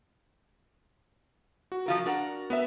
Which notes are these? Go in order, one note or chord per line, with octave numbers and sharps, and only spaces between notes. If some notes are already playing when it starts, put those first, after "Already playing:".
F#4
F3 F4 A#4
D4 A#4 F#5
B3 B4 E5